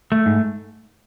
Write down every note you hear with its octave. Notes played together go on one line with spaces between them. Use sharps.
A3
G#2